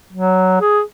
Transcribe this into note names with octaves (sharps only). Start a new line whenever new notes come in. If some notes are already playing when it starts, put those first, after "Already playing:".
F#3
G#4